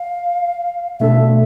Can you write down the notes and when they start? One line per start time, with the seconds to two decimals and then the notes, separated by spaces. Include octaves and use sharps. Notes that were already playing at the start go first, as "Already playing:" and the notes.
Already playing: F5
0.99 B2 A3 D4 A4 E5